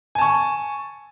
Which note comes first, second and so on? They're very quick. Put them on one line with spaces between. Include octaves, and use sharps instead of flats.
G#5 A5 C#6